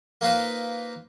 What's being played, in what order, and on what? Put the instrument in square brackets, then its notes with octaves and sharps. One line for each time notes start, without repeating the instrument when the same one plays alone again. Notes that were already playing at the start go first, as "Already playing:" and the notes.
[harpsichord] A#3 D#4 F4 B4 C5